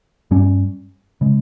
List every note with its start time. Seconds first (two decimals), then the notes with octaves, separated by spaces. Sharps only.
0.31 G2 G3 C#4
1.21 C#3 G#3